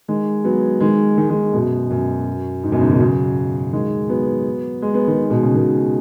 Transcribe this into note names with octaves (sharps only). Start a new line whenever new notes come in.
D#3 G#3
F#3 B3
D#3 G#3
D#3 G#3
D#3 G#3
F#2 B2
F#2
G#2
F#2 B2
G#2 C#3
B2 D#3
C#3 F#3
D#3 G#3
F#3 B3
G#3
B3
D#3 G#3
B2
C#3
B2 D#3